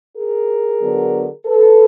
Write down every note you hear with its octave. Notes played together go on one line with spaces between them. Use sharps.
G#4 A#4
D3 F#3 B3 D4
A4 B4